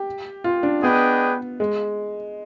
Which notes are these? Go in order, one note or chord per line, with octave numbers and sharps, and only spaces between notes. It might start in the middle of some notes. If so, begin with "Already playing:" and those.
Already playing: G4
F4
D4
B3 D4 G#4 B4 D#5 G5
G#3